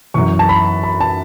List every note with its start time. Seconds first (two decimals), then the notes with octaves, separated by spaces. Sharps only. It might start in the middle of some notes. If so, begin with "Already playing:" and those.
0.14 F#2 E3 C#6
0.39 A5
0.49 B5
0.84 B5
1.00 A5